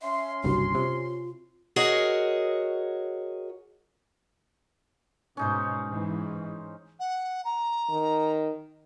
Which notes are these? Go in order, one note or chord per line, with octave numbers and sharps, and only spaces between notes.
C#4 E5 C6
F#1 C2 G2 F#4
C3 F4
F#4 G#4 A#4 C#5 D#5 F#5
G#2 B2 C#4 D#4 C5
G#2 E3
F#5
A#5
D#3